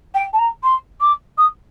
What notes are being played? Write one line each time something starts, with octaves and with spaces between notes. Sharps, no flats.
G5
A5
A#5
C6
D6
D#6